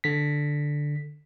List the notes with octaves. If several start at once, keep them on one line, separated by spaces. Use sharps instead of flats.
D3 B6